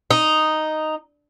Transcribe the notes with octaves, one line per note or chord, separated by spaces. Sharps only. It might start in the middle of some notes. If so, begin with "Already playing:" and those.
D#4